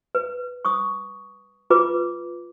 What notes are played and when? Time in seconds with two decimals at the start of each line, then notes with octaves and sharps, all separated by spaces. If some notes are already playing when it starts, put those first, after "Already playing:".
0.15 B4
0.65 C#6 D#6
1.70 F4 B4 D6